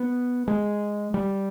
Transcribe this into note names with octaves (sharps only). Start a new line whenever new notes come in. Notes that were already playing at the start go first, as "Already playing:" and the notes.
Already playing: B3
G#3
G3